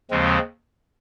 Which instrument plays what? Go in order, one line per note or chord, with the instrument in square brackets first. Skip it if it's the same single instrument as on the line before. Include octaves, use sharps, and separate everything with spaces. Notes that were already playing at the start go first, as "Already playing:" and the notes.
[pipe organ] D#2 C#3 F3 G#3 C4